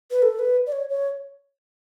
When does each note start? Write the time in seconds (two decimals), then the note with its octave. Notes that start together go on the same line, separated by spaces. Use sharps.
0.11 B4
0.22 A4
0.39 B4
0.67 D5
0.72 C#5
0.89 C#5